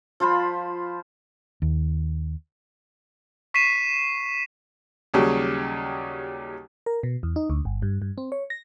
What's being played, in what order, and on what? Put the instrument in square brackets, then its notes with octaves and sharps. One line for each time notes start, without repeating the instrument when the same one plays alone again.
[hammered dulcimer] F3 F4 C5 B5
[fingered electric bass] D#2
[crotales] C#6 B6 C7 D#7 E7
[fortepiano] D#2 C#3 F#3 G3
[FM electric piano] A#4
B2
E2
D#4
D2
G1
G2
G2
C4
C#5
A#6